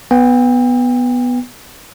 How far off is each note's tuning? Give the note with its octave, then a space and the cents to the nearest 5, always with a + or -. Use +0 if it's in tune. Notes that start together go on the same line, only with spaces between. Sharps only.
B3 +0 G5 +35